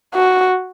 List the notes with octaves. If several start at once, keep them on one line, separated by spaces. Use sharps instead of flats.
F#4